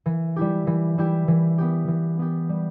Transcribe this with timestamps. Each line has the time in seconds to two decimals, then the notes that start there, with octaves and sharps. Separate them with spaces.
0.06 E3
0.36 G3 E4 G4
0.67 E3
0.98 G3 E4 G4
1.28 E3
1.58 B3 G4
1.88 E3
2.19 B3 G4
2.49 G3